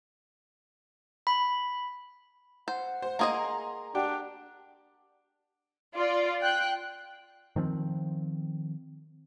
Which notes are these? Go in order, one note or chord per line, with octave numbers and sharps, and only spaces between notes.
B5
C5 F#5
C5
A#3 G#4 D#5 A#5 C6
D4 G4 F#5
F4 D5
G5 F#6
D#3 F3 A3 C4